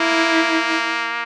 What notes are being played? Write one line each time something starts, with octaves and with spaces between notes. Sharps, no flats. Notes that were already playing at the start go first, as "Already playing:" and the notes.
Already playing: A#3 E4